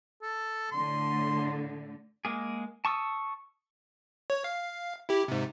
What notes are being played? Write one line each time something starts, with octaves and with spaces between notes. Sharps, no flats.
A4
A2 D3 C6
G#3 A#3 G#4
A5 C#6 D#6 E6
C#5
F5
E4 G4
G#2 C3